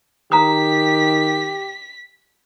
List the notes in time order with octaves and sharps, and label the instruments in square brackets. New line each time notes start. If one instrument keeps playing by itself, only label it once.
[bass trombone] D#3 [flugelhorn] G4 [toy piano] A#5 D#6 [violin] B6